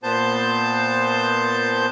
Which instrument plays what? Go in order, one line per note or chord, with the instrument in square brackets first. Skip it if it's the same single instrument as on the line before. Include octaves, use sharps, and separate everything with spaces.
[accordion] A#2 B3 C5 A5 G6